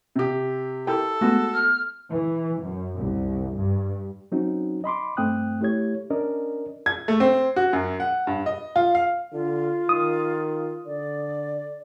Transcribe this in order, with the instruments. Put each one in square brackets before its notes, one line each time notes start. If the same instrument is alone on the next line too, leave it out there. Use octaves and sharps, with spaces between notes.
[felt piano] C3 G4
[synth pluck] E4 G4 A#4 [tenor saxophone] A4 [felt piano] G5
[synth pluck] G#3 A3 B3 [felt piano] F#4
[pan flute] F6
[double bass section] E3
F#2
C2
G2
[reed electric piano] F#3 C4 C#4 D#4 F#4
D#5 B5 C6 D6
G2 A3 C4 G5 D#6 F#6
A3 E4 G4 C#5 G#6
C#4 D4 A#4 D5 D#5
[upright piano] G#6
A3
C4
F#4
F#2
F#5
G2
D#5
F4
F5
[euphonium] D3 [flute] F4
[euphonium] D#3 [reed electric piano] D#6
[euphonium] D3 [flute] D5